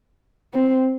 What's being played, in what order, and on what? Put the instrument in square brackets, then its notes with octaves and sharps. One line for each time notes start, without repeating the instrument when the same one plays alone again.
[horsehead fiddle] C4